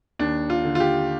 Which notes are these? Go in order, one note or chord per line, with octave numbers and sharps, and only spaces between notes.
D#2 D4
F4
D3
F4
G4